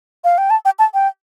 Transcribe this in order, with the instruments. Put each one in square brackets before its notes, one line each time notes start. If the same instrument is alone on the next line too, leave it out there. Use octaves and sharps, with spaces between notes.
[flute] F5
G5
A5
G5
A5
G5